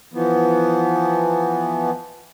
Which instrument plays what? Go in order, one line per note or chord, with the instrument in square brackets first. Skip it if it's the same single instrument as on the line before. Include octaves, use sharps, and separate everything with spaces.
[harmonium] E3 F3 B3